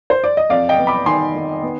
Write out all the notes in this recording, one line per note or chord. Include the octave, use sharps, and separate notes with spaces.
C5
D5
D#5
F2 D5 F5
D#5 G5
B3
B5 D6
D#3 G#5 C6
D#3
B3